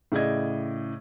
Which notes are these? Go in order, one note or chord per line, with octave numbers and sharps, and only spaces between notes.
A2 C#3 D5 D#5 G#6